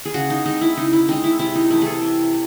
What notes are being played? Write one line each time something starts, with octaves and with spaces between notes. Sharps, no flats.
G#4
C#3 F#4
D#4
G#3 C4 D#4
E4
C#3 D#4
E4
G#3 C4 D#4
E4
C3 E4
D#4
E3 A3 E4
G#4 A4
C3